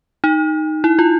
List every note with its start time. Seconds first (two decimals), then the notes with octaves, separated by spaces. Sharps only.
0.24 D#4
0.84 E4
0.99 F4